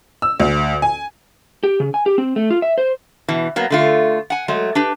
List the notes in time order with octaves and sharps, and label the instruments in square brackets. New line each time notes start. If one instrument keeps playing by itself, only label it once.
[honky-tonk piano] E6
D2
G#5
[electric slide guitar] G4
C#3
G#5
G4
C4
A3
F4
E5
C5
[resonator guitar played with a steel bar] B2 E3
F#3 A#3 B3
D3 A3 F4
F#5 G#5
F#3 G#3 A3
D4 G4 B4